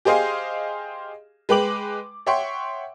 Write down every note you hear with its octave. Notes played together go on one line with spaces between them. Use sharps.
G4 G#4 C5 D#5 F5 G#5
G#3 B4 G5 D6 F#7
C#5 E5 F#5 G5 C6 C#6